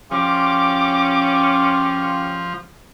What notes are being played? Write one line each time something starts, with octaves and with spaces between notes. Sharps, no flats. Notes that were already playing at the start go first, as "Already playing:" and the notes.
F3 C#4 F4 G4 D6